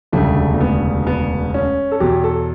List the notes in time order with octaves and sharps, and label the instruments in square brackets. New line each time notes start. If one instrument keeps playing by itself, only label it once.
[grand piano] E1 D2 C#3 G3 A3
A3
B3
B3
C#4
A4
E2 B2 F#3 G4
A4